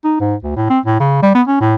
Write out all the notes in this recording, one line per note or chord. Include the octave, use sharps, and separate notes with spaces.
D#4
G#2
D2
A2
C4
A2
C#3
G3
B3
C#4
A2